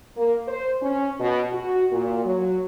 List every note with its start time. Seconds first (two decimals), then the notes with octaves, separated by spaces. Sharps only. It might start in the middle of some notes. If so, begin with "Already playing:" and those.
0.16 A#3
0.47 C5
0.81 C#4
1.18 B2
1.51 F#4
1.91 A#2
2.23 F#3